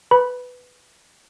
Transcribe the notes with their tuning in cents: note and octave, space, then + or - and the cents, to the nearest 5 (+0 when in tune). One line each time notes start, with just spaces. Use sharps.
B4 +10 B5 -15